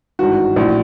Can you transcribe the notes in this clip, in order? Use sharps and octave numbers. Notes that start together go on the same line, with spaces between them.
G#1 G2 E3 F#4
A#1 A2 E3